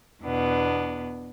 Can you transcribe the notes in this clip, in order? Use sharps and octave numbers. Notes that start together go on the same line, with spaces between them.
E2 B2 B3 D4